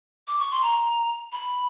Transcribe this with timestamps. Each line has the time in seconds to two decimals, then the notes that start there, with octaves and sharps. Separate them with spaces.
0.27 D6
0.39 C#6
0.51 C6
0.62 A#5
1.32 B5